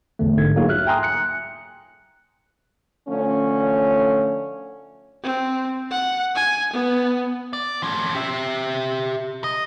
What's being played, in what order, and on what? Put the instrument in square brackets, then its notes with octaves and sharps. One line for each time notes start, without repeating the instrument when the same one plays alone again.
[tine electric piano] A#1 E2 D3 A3
G#2 D3 G#6
F#3 A#3 D#4 F4 F#4 G#4
E5 F6 F#6
G5 G#5 A#5 C6 D#6
F#6 C#7
[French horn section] D3 F3 A3 C#4
[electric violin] C4
F#5
G#5
B3
[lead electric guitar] D5
F3 C#4
G4 E5
D#5